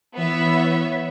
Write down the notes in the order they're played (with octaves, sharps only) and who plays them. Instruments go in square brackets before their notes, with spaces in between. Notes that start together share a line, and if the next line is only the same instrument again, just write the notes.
[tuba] E3 [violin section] B3 C#5 E5